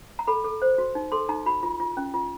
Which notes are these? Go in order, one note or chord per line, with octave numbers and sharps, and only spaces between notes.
A#5
A4 B5
A4
C5
F#4
D#4
A4 C6
D#4 A#5
F#4 B5
F4
F4
C#4
F4